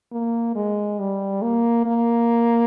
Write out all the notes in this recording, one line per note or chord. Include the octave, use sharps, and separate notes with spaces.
A#3
G#3
G3
A#3
A#3